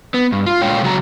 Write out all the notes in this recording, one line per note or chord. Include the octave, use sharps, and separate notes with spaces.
B3
G2
F4
A#2 G#3 C#5 F5 G5
C#3 F#3 F#4 C5 A#5